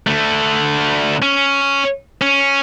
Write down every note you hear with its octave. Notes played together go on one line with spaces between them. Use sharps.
D3 A3
C#4
C#4